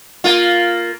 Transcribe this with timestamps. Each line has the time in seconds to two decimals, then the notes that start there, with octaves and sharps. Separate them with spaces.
0.24 A#3 F4